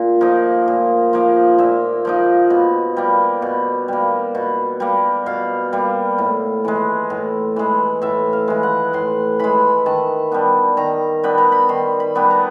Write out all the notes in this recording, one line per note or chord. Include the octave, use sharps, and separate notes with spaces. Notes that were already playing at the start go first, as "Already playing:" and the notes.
Already playing: A#2
F3 A#3 D#4
A#2
F3 A#3 D#4
A#2 E5
F3 A#3 D#4
B2
G3 A#3
B2
G3 A#3
B2
G3 A#3
B2 F5
G3 A#3
A2
E3 G#3
A2
E3 G#3
A2 E5
F5
E3 G#3
F#5
A2 C6
E3 G#3 B5
D#3 A5
G3 B3 D4
D#3 A#5
G3 B3 D4 B5
A#5
B5
D#3 C6
B5
G3 B3 D4
A#5